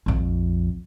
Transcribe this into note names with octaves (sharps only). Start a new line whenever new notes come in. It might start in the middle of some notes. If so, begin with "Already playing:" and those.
A#1 F2